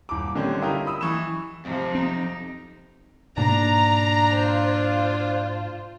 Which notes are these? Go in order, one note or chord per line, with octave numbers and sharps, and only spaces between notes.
D#1 D6
D3 D#3 G3 C4 C#4
E4 F4 G4 A#4 D#5
B5 D#6 E6
E3 C#6 E7
F2 C3 F3
C4 D#4
G#2 B2 A#3 D4 A#5
F4 C5